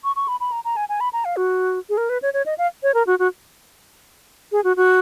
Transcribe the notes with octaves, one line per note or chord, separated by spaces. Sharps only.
C#6
C#6
B5
B5
A#5
A#5
G#5
G#5
B5
A#5
F5
F#4
G#4
A#4
B4
C#5
C#5
D#5
F5
C#5
A#4
F#4
F#4
G#4
F#4
F#4